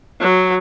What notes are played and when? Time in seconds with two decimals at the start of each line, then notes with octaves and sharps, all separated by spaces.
0.20 F#3